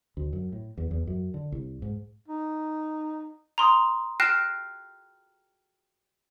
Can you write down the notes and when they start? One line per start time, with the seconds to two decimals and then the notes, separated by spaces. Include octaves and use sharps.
0.17 D2
0.33 F#2
0.52 A2
0.77 E2
0.91 E2
1.07 F#2
1.34 D3
1.52 C2
1.82 G#2
2.28 D#4
3.58 A#5 C6 D#6
4.20 G5 F6 F#6 A#6 C7 E7